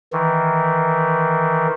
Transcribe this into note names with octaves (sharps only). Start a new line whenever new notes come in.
D#3 E3